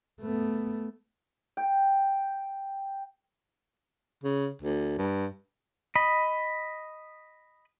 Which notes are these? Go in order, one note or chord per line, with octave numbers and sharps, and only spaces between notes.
A3 B3
G5
C#3
D2
G2
D#5 B5